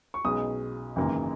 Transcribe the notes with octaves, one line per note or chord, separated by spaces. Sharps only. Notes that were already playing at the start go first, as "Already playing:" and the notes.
C#6
B1 B2 G#3 C#4 D#6
G#1 F#2 C#3 E3 A#3